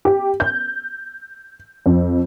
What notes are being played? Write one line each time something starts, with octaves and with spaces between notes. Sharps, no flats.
G4
G6
F2